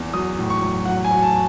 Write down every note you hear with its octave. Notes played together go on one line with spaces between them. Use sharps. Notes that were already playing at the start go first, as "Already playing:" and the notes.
Already playing: E2
F#3 D#6
A2
C#6
F#3
F#3 F#5
G#5
F#3
A5